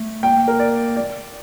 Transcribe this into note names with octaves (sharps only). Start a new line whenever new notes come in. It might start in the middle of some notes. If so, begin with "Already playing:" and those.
Already playing: A3
A#3 G5
A#4
D5
D5